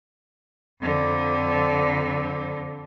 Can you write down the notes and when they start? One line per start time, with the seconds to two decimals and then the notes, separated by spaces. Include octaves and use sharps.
0.81 F2 D3